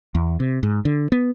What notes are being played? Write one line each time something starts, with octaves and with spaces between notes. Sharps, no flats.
E2
C3
G#2
D3
B3